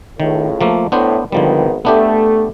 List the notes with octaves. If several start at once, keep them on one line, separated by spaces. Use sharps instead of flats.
C#2 A2 D#3
F3 A3 A#3
A2 B3 D4 C5
G#1 D3 D#3 F3 G3 B3
A3 B3 D4 G4